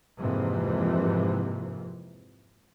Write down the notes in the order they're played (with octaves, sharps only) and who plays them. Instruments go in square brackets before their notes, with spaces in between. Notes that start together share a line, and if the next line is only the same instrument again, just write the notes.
[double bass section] F2 G#2 C3 E3 F3 A#3